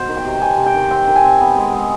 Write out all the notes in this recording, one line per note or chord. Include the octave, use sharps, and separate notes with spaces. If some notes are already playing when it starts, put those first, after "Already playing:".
Already playing: B2 C5
D#3
G5
C3
C3 G#5
C3
G5
D#3
C4 G5
D#3
G#5
C4
B3
G#3
G#3